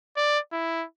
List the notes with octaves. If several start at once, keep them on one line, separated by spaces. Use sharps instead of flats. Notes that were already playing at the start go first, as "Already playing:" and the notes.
D5
E4